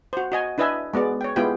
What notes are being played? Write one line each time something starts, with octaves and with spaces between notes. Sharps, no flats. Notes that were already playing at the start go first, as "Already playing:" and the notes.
F#4 C5
F#4 D#5 G#5
D4 E4 B4 D#5 E5 G#5
G#3 B3 F#4 D5
C#5 G5
G#3 B3 E4 F4 G4 G5